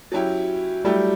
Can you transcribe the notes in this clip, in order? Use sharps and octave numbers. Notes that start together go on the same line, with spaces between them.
F#3 C#4 E4 G4
F#3 G3 A3 E4 G4